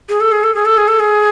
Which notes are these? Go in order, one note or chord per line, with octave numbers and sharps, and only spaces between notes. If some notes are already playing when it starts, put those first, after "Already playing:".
G#4
A4
G#4
A4
G#4
A4
G#4
A4
G#4